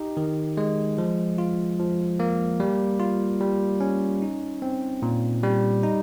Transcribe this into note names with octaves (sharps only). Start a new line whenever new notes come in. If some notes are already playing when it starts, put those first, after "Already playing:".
Already playing: D#4 G4
D#3
G#3
F3
F4
F3
A#3
G3
F4
G3
C#4
D#4
C4
A#2
G3
D#4